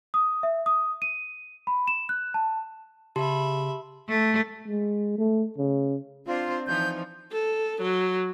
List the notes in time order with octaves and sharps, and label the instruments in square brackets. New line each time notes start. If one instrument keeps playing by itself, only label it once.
[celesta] D#6
E5
D#6
D#7
B5
E7
F#6
A5
[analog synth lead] C#3 [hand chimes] G4 A5 C6 [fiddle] E5 B5
[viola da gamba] A3
[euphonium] G#3
A3
C#3
[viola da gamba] C4 D4 C5 [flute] F4
[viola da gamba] E3 F3 D#4 [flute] G6
[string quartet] A4
F#3